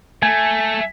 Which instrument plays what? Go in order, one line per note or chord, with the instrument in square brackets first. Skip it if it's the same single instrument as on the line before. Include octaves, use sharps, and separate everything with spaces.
[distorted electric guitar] A3 [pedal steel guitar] G#5